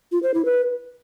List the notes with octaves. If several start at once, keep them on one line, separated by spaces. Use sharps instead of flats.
F4
C5
E4
B4